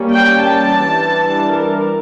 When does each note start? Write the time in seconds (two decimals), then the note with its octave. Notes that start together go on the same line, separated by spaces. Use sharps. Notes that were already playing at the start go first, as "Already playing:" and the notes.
Already playing: G3 A#3 C#4
0.14 G5
0.42 A5
0.70 E3 G3 D4
1.26 A5
1.53 A#4